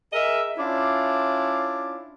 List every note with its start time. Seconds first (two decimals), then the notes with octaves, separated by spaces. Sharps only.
0.13 G#4 A#4 D#5 E5
0.58 C#4 D4 E4 F4